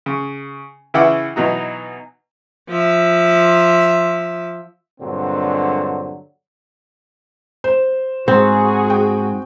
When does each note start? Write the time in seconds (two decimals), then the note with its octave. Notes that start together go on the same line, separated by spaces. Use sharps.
0.06 C#3
0.94 C#3 E3 E4 F#5 G5 D6
1.36 B2 E3 F#3 D#4
2.69 F3 E5
5.01 G2 A#2 D3 F#3 G#3 C4
7.64 C5
8.28 G#2 C4 F#4 G#4
8.90 G5